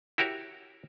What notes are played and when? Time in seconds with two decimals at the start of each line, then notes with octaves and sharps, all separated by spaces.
0.18 E4 F#4 G4 A#4 C#5